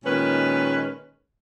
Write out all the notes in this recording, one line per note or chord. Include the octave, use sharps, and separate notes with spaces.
A#2 D#3 G#3 C#4 B4